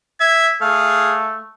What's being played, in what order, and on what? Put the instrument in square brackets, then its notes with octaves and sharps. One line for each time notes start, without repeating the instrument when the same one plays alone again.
[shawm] E5 [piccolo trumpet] G#6
[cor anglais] A3 [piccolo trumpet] G#4 [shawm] F5